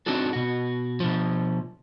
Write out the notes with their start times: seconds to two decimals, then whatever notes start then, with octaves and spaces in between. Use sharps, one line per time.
0.06 C4 D4 D#4 F#4 A4
0.33 B2 F#4
1.00 B2 F3